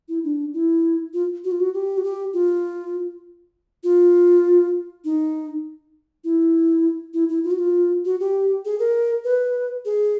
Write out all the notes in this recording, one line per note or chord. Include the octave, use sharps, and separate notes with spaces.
E4
D4
E4
F4
F#4
F4
F#4
G4
F#4
G4
F4
F4
D#4
E4
E4
E4
F4
F#4
F4
F#4
G4
G#4
A#4
B4
G#4